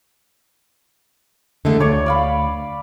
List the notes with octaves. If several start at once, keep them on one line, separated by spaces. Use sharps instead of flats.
D3 G#3 A3
D2 C#5 D5 C#6
D5 F5 B5